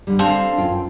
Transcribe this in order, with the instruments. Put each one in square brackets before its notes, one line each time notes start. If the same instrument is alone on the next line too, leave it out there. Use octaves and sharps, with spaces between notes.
[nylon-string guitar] D3 G3
[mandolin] C4 A4 F5 [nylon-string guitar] D4
[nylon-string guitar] F#2 F4 G5